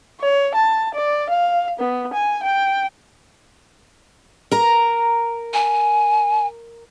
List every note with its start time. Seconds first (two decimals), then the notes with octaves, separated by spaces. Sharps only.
0.20 C#5
0.55 A5
0.94 D5
1.30 F5
1.79 B3
2.13 G#5
2.43 G5
4.51 A#4 A#5
5.53 G#5